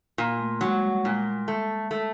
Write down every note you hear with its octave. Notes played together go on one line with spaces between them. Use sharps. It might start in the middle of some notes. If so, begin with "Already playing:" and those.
A#2 A#3
A3
F#3 G#3
G3
A#2 G#3
A3
A3